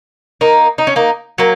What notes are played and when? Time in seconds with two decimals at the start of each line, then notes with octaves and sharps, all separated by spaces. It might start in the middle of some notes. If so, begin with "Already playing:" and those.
0.41 A#3 D#4
0.78 D#4
0.87 C#4
0.96 A#3 D#4
1.38 F#3 A#3